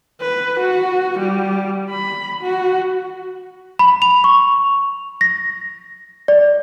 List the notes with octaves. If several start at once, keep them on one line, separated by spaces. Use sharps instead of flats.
B4
F#4
G3
B5
F#4
B5
F7
C#6
A#6
D5